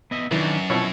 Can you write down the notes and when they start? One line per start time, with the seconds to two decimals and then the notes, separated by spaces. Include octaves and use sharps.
0.11 B3 D#5 E5
0.31 F#2 D#3 E3 D4
0.70 B2 F3 E4 C#5